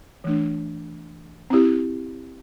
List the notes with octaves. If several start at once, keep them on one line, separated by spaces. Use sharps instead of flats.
E3 A3 D4
C4 E4 G4